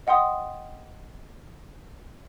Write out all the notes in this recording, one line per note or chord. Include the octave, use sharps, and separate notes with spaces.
D#5 F#5 G5 C6 D#6